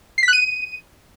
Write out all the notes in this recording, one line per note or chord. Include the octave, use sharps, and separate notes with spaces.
C7
B6
F#6
D#7